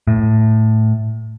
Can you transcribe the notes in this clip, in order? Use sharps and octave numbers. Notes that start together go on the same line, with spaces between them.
A2